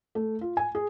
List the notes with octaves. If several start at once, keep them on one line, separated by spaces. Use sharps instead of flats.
A3
F4
G#5
G#4